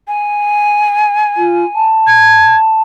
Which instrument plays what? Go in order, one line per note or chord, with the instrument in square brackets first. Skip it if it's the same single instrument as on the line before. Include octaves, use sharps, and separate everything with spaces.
[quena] G#5
[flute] F4
A5
[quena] G#6